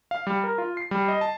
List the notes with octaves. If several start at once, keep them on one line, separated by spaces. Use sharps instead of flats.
F5
G3
A#4
F4
C7
G3
D#5
A5